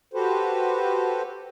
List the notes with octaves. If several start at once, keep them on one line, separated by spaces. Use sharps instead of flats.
F#4 G4 A4 B4 C5